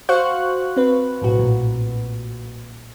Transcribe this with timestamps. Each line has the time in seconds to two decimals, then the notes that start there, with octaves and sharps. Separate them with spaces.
0.09 F#4 C5 F5 C#6 F#6
0.77 C4 B4
1.21 B1 A2 F#4
1.39 A#2